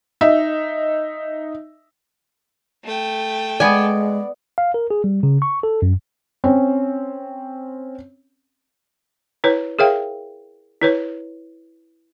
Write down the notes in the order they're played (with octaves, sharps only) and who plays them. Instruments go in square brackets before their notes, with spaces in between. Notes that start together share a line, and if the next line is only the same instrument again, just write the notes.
[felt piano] D#4 E5
[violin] A3 G5
[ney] G#3 [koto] B3 G#5 [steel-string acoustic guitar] D5
[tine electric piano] F5
A#4
G#4
G3
C#3
C#6
A4
F#2
[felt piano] C4 C#4
[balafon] E4 B4 C#5
G#4 A#4 C#5 E5 F5 G5
E4 B4 C#5